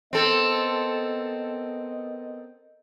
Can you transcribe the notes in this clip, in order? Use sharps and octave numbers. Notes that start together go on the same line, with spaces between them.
B3 C4 A4 A#4 D#5